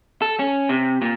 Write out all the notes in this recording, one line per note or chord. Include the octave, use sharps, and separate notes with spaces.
A4
C#4
C3
A#2